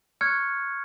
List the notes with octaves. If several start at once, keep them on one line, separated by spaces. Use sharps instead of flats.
C#6 F6 F#6 G#6 C#7